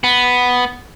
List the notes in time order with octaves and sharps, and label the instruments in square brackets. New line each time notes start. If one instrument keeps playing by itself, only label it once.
[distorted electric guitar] B3